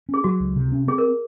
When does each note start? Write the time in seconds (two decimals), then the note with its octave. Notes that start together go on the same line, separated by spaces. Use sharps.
0.09 C#4
0.14 G#4
0.24 F#3 F#4
0.40 C#2
0.56 C3
0.72 C#4
0.88 C4 G#4
0.98 A#4